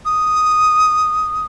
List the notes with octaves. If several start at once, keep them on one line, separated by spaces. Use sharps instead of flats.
D#6